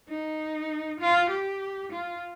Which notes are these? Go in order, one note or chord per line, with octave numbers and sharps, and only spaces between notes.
D#4
F4
G4
F4